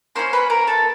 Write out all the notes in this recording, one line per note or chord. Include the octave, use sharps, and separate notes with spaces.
A#3 C#4 E4 C5 C6
B4 B5
A#4 A#5
A4 A5